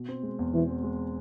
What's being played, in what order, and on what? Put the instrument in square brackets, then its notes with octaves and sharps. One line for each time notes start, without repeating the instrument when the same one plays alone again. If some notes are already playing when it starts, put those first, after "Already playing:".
Already playing: [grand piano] B2
C4
G#3
E2
[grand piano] B2 [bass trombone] E3
[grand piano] C4
G#3